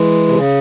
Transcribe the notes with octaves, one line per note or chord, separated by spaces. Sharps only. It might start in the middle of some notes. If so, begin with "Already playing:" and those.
Already playing: E3 G#3
C3
C#3